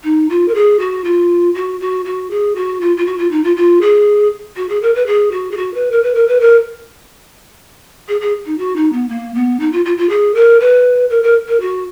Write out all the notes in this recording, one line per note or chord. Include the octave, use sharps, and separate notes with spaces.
D#4
F4
A#4
G#4
F#4
F4
F#4
F#4
F#4
G#4
F#4
F4
F4
F#4
F4
D#4
F4
F4
G#4
F#4
G#4
A#4
B4
G#4
F#4
G#4
F#4
B4
A#4
B4
A#4
B4
A#4
G#4
G#4
D#4
F#4
D#4
B3
A#3
B3
D#4
F4
F4
F4
G#4
A#4
B4
A#4
A#4
A#4
F#4